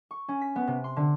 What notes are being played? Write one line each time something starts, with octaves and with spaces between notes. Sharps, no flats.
C#6
C#4
B6
B3
C3
C6
D3